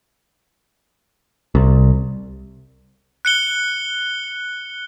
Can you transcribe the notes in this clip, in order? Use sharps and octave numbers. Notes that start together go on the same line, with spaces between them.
C2
F#6 C#7 G7